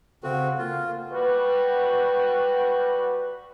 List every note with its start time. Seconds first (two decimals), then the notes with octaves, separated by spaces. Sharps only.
0.23 C#3 C4 F#4 A4 F5 F#5
0.58 A#3 F4
1.13 G3 F#4 B4